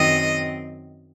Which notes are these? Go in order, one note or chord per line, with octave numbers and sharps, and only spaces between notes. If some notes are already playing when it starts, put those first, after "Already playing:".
Already playing: F#2 D#3 F#3 C4 D#5